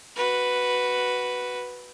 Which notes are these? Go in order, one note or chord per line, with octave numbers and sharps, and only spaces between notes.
F#4 B4